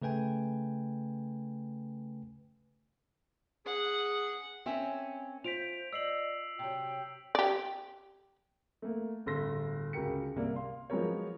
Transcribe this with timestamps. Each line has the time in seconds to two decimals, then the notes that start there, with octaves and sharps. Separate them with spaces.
0.02 C#3 A3 B4 G5 G#5
3.66 G#4 F#5
4.66 C4 C#4 A#4 C#5 E5
5.44 F4 C5 B6 D7 F7
5.93 D5 D#5 E6 C7 F#7
6.59 C3 F#3 G5
7.35 G4 D5
8.82 A3 A#3
9.26 D1 G1 A4 C6 A#6
9.93 C#2 F#4 A#4 G5 C#7
10.36 C2 A#3 D5
10.56 F5 C6
10.90 F3 F#3 G#3 B3 A#4 C#5